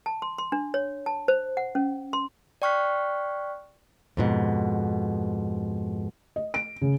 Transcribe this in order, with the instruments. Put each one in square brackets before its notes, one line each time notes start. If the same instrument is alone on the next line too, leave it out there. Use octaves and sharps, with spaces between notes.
[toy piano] A5
C6
C6
D4
C#5
A5
C5
F#5
C#4
C6
[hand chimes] D5 G5 C#6 F6 F#6 B6
[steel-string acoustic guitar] F2 G#2 B2
[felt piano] D#5
D7
C#3